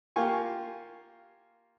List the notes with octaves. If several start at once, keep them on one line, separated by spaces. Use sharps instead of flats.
A#3 F4 G4 G#5 C#6